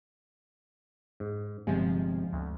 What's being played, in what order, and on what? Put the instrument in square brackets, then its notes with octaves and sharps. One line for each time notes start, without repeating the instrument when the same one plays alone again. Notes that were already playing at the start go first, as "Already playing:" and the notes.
[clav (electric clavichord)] G#2
[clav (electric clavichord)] G1 C3 G#5 [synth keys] F3 G#3
[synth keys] D2